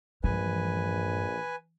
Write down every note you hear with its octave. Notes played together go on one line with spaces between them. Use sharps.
A#1 G2 E3 F3 G#3 B4 G#5